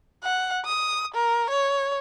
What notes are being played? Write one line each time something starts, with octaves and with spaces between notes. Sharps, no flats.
F#5
D#6
A#4
C#5